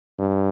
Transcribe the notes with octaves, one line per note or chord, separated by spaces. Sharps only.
G2